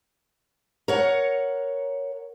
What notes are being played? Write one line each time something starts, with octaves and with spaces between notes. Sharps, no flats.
A#4 C#5 F#5